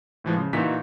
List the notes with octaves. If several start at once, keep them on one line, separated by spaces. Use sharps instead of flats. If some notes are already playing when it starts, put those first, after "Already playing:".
A2 E3 F3 G#3
C#3
A#2 E3 D#4 F#4 B6